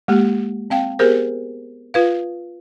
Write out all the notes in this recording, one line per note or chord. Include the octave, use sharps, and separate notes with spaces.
G#3 A#3 G4
C4 F5 G5
B3 G4 G#4 A#4 C5
F4 B4 F5